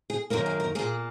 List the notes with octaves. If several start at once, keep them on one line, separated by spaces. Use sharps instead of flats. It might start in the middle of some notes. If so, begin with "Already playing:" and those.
G#4
F#2 D#3 A#3 A#4
G#4
A#4
A#2 A#3 G#4